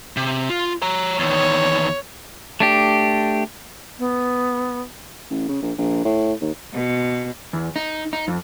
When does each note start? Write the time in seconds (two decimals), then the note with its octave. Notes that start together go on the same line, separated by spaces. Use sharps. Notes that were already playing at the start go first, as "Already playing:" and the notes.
0.17 C3
0.49 F4
0.82 C#5 A#5
1.19 E2 D#3 C#5
2.60 A3 D4 G4
3.99 B3
5.31 A1
5.49 C#3
5.63 A#1
5.78 A#1
6.05 A2
6.41 D#2
6.73 B2
7.53 E2
7.76 D#4
8.13 D#4
8.28 F2